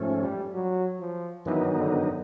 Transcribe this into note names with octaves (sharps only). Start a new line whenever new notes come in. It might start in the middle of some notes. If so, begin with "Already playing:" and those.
Already playing: G#2 F3 A3 C#4
G3
F#3
F3
G2 D#3 E3 F#3 B3 D#4
D3